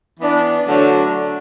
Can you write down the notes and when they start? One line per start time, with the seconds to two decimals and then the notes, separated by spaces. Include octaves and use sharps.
0.20 E3 B3 D4
0.67 D3 F#3 A3 D4 A4